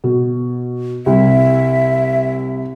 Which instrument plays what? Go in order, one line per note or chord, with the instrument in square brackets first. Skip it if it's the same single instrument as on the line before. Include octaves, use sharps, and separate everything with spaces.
[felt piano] B2
[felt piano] C2 [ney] E5